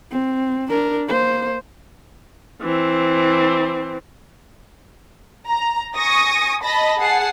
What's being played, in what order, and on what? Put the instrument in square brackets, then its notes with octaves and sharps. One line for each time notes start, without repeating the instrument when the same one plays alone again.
[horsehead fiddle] C4
D4 A#4
A#3 C5
[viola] E3 C4
[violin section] A#5
G#5 C#6 D#6 A#6
D#5 A5 B5 A#6
G#4 F#5 A5 C7